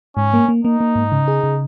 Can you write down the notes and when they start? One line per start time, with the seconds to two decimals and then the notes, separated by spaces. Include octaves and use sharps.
0.17 G#2 C#4
0.34 A#3
0.49 A#3
0.65 A#3 D#4
0.80 A#3
0.96 G#2
1.12 C#3
1.28 G#4
1.44 C#3